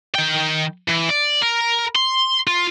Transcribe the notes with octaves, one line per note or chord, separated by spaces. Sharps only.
D#3 G5
E3
D5
A#4
C6
F4